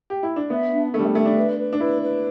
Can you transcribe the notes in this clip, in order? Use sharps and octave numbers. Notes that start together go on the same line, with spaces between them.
G4
E4
D4
B3 E5
D4
A3 D4
G3
A3
A3 E5
D4
B4
B4
D4
E4 B4
B4